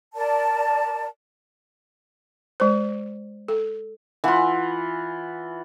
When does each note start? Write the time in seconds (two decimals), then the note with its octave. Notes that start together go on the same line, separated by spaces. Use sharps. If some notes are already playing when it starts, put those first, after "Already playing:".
0.15 A#4 D5 A5
2.60 G#3 C5
3.48 A4
4.24 E3 F4 E5 F#5